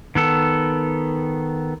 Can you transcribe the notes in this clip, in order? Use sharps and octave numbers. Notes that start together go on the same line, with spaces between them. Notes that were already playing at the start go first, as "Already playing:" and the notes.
D#3 B3 A4